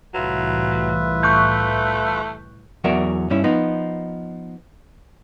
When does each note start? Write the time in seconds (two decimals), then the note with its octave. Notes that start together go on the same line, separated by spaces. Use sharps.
0.14 C2 A2 E3 F#3 F4 B4 E5
1.23 A3 C#6 F#6 G6
2.84 E2 F#3 F#4 A#4 D5 E5
3.30 G2 C#4 E4
3.44 F3 B3 D#4